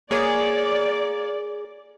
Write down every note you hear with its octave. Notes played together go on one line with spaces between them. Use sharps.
A#3 G#4 C#5 D5